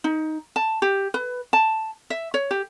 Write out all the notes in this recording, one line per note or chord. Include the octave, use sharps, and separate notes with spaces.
D#4
A5
G4
B4
A5
E5
C#5
G4